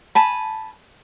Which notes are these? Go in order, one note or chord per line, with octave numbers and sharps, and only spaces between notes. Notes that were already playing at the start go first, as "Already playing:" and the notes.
G#5 A5 B5